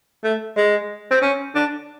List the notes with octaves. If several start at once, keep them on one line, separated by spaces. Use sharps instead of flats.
A3
G#3
C4
C#4
D4